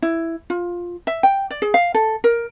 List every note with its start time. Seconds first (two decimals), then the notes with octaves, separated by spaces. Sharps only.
0.02 E4
0.50 F4
1.07 E5
1.23 G5
1.51 D5
1.62 G#4
1.74 F5
1.94 A4
2.24 A#4